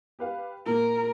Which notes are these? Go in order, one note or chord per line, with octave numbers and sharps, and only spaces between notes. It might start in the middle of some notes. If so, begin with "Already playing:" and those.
G4 B4 F5
A#2 A#4